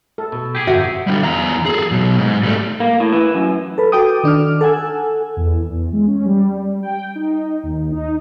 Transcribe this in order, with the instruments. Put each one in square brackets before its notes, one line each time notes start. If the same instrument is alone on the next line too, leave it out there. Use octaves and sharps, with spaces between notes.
[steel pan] A4
[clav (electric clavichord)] B2
[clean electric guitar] G4 G#4
[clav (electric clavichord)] G1 F2 C3 [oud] F#4 [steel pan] E5
[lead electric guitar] D3 G3
E2 A#5
G#4 A4
B2 F#3
G#2
G3 A3
[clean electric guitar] A#3
A2
E3
F#2
[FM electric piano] A4 B4
F#4 A4 G5 D6 D#6
D#3 D4 D6 F6
A4 F#5 G#5 E6
[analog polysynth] E2
E2
G#3
C#4
G3
G5
D#4
D#2
D#4